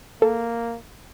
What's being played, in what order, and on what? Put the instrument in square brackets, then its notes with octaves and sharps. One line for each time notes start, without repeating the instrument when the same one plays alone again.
[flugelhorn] A#3 [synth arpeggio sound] A4